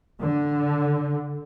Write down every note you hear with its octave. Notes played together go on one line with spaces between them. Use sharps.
D3